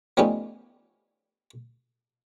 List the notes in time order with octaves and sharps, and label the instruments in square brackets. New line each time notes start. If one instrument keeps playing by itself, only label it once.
[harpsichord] F3 G3 A3 B3 C#4 D#4